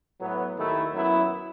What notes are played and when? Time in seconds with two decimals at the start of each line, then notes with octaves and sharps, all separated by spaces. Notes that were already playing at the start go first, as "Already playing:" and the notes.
0.20 A2 F#3 B3
0.57 D#2 D#3 A3 E4
0.93 F#2 F#3 B3 E4